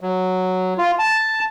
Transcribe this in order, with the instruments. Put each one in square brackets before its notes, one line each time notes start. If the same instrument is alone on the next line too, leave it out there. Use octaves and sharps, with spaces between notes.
[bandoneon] F#3
F4
A5